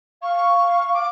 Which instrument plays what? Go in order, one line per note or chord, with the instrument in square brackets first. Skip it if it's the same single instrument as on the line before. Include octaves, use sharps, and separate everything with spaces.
[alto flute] F5 [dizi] C#6
[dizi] D6